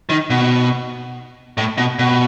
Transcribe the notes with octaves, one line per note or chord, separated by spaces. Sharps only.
D#3
B2
A2
B2
B2